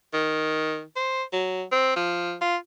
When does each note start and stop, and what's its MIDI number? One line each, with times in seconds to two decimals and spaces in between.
0.13 0.83 51
0.96 1.23 72
1.33 1.63 54
1.72 1.94 60
1.96 2.35 53
2.41 2.56 65